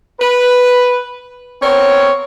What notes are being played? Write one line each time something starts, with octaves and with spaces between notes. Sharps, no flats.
B4
B3 C4 A#4 C#5